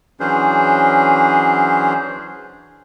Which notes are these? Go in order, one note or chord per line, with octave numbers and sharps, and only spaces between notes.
E3 F#3 C#4 D4 G#4 C5